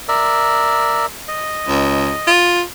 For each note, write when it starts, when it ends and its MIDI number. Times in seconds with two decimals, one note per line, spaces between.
0.08 1.06 70
0.08 1.06 74
0.08 1.06 76
1.28 2.31 75
1.68 2.12 37
2.27 2.62 65